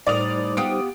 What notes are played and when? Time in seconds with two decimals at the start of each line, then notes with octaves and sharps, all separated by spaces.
0.07 A2 G3 D#4 A#4 C5 D5 D#6 F7
0.57 B3 F4 G4 D#6 D7